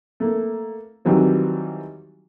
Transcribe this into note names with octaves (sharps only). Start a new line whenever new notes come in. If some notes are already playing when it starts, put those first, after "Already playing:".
A3 A#3
D#3 E3 F#3 G3 C4